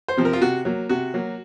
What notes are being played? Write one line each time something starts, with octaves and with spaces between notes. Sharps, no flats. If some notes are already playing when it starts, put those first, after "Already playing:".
C5
C3 F3 C4
A#4
F4
C3 F#4
F#3 A#3
C3 F#4
F#3 A#3